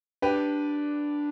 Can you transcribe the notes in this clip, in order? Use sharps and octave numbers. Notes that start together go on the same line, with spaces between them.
D4 G4 B4